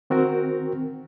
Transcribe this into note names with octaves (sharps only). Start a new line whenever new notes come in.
D#3 C4 F#4 A#4